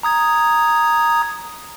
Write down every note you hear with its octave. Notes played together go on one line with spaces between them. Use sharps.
A#5 D#6 G#6